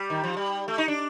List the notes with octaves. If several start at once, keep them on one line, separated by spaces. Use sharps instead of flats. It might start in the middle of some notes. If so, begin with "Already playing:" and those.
Already playing: G3
D#3
F3
G3
A3
D#4
D4